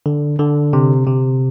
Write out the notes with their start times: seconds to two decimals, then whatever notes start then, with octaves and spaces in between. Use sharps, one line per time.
0.06 D3
0.39 D3
0.73 C3
1.07 C3